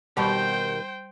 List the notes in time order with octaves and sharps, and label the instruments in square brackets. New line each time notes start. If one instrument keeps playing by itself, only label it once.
[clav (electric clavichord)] B2 [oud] D#3 B3 G4 [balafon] G3 [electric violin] C5 G5